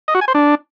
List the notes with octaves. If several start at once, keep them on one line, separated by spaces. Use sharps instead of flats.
D#5
F#4
G#5
C5
D4